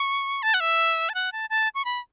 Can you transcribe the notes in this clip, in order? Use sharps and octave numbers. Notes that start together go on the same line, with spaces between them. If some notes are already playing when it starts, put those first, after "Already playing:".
Already playing: C#6
A5
F#5
E5
A5
F#5
A5
A5
C#6
B5